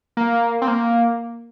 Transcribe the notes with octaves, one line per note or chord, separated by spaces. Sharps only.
A#3
C4
A#3